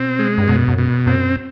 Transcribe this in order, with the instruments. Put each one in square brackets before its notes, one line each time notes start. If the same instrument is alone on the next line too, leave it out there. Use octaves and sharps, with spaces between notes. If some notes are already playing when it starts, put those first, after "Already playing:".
Already playing: [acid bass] B2 [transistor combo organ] C4
[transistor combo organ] G#3
[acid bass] G2
[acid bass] F#2 [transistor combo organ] B2
[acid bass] F#2
[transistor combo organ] B2
[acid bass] F#2 [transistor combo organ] C4